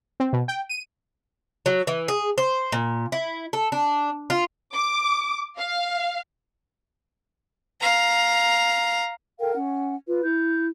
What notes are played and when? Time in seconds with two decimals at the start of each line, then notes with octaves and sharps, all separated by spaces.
0.20 C4
0.33 B2
0.48 G5
0.69 D#7
1.66 F#3
1.87 E3
2.08 G#4
2.38 C5
2.72 A#2
3.12 E4
3.53 A4
3.72 D4
4.30 F4
4.74 D6
5.58 F5
7.81 F5 A#5
9.40 A4 A#4 F5 G5
9.55 C#4 F#5
10.07 F4 B4
10.23 E4 G6